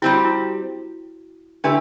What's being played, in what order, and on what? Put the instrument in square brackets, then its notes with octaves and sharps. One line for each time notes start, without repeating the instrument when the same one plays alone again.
[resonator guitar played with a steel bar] G3 C4 G4 [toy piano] E4
[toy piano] F#4
E4
[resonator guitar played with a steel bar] D3 A3 E4 G4 B4 [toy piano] D4